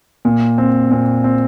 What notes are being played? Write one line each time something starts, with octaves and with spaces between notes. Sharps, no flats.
A#2
C4
A#2
C4